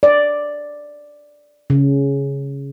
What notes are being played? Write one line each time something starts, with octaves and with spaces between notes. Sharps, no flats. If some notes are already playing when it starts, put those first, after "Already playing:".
D5
C#3